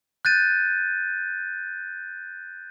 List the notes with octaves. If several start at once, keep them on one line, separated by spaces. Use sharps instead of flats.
F#6 G6 A6 D#7